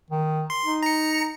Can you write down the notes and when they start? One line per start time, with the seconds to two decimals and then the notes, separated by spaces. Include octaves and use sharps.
0.11 D#3
0.50 C6
0.65 D#4
0.83 A#5 C#7